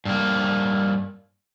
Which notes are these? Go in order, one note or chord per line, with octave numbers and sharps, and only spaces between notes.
G2 A#3